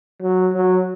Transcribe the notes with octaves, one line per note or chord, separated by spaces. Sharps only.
F#3
F#3